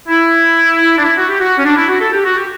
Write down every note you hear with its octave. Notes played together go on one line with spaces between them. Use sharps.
E4
D4
E4
F#4
G4
F#4
C#4
D4
E4
F#4
A4
G4
F#4
G4